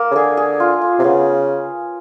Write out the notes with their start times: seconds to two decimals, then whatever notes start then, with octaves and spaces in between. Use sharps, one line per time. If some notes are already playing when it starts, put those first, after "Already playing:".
Already playing: A#3
0.11 C#3
0.15 D3 G#4
0.37 G#4
0.60 F4
0.81 F4
0.99 C3
1.04 C#3 B3